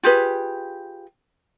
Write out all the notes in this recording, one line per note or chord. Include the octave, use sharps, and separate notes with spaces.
F4 G4 G#4 B4